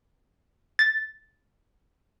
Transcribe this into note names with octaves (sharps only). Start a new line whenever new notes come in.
A6